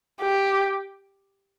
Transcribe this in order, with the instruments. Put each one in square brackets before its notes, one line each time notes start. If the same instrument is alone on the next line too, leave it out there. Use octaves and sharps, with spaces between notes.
[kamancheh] G4